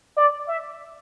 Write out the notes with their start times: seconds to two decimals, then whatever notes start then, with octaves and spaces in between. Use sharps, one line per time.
0.17 D5
0.48 E5